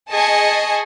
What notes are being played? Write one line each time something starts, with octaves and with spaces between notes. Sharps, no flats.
G#4 D#5 G#5 A5 C#6